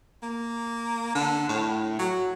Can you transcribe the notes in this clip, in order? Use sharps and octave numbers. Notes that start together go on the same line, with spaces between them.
A#3
D3
A2
F#3